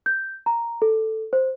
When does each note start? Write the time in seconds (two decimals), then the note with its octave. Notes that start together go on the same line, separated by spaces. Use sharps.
0.06 G6
0.46 A#5
0.82 A4
1.33 C5